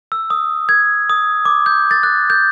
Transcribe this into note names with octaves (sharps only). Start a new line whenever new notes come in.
E6
D#6
G#6
D#6
D6
G6
A6
F#6
G6